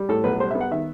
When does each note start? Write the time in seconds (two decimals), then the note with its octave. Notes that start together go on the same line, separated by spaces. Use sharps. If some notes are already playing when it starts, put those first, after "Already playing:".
Already playing: G3
0.09 A2 A4
0.24 B1 B4
0.40 G3 C5
0.51 E5
0.55 B3
0.61 F#5
0.71 D#3 E5